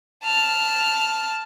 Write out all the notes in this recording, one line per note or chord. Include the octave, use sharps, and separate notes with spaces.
A5 F6